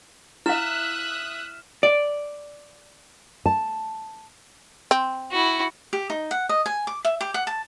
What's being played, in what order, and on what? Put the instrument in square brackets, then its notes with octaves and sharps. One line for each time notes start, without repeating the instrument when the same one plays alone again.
[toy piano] E4 F5 [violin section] E5 D#6 F#6 [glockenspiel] F6 E7
[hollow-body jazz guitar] D5
[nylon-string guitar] A5
[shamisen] C4
[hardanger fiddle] E4 F#4
[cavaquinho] G4
D#4
F#5
D#5
G#5
D6
E5
G4
F#5
A5